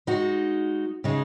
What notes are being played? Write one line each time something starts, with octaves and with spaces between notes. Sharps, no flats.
G#3 D#4 F#4
C#3 G#3 D#4 G#4